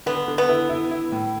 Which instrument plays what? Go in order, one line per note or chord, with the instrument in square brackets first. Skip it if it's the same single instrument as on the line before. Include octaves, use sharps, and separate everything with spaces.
[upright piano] D3 [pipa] B3
[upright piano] D3
[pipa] B3
[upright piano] E4
E4
E4
A2